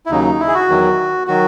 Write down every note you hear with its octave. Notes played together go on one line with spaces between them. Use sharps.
E4
D#2 C#3 F#3 D#4
E4
G#4
F#4
E2 D#3 F#3
D#3 F#3 F#4